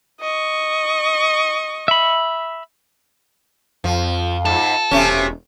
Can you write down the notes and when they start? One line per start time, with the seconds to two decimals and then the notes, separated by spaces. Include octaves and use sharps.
0.21 D#5 C#6
1.88 E5 B5
3.84 F2 F3
4.45 G#2 A4
4.91 E1 C3 A3 C#4